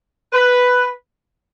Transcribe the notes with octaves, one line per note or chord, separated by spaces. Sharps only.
B4